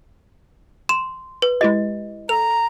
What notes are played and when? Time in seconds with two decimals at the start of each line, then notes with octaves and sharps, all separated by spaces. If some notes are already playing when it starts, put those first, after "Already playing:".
0.89 C6 E7
1.42 B4
1.61 G#3 E4 G4 D#5
2.29 A4 A#5 F7